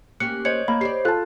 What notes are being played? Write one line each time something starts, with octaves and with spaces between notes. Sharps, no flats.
A#3 C#4 G4 F#6 C#7
C5 C#5 D#5 G#6 C#7
A#3 B5
G4 C5 D5 C7
F4 A4 A5 F#6